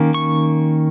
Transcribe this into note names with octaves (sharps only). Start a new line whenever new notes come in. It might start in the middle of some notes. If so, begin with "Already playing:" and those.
Already playing: D#3 A#3 C#4
C#6